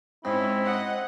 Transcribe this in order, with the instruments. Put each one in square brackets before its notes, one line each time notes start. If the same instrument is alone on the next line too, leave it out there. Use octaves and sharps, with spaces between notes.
[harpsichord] G#2 [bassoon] C4 [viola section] C#4 [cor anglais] E4
[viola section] D#5 F#5